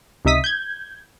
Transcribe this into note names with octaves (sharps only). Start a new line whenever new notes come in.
C#2 C3 D#4 E5 D#6 B6
G6 G#6